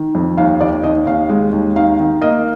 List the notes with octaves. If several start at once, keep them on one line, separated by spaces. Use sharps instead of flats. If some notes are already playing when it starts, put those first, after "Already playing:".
Already playing: D#3
F2
D#2 F5
D#2 D5
D#2 D#5
D#2 F5
G#3
D#2
D#3 F5
D#3
A#3 D#5